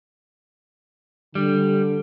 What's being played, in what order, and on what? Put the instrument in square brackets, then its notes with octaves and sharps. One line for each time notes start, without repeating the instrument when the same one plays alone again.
[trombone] D3 [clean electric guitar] G3